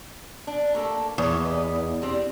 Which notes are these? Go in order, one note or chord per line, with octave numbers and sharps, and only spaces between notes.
D4
A3 A#3 A4
E2 B3 C#5
B4 D#5
G3 C4 D4